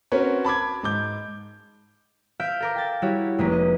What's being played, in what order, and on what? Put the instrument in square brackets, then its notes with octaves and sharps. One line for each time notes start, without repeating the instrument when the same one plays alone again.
[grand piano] C4 C#4 F#4 A#4 B4 C#5
A5 B5 D6 G#6
G#2 D6 G6
[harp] E5 F5 F6 G6 B6 D7
A4 A#4 D6
G5 A6
G3 E4 F#4 G4 C#5
F1 G#3 A#3 C#4 B4
D#5